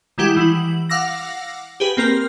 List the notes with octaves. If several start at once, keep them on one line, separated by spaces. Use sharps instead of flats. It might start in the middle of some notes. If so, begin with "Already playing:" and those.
D#3 G3 G#3 E4 G4 F#5
E3 E4 F#7
F5 F#5 D6 E6 A#6
G4 G#4 B4
A#3 C4 A#4 F6